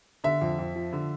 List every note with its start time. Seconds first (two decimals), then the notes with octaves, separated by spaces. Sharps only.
0.24 D3 E5
0.41 F2
0.59 F2
0.75 F3
0.93 D3